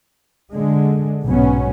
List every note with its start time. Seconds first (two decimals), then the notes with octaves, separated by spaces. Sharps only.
0.52 D3 G#3
1.24 B1 G#2 F#3 B3 C#4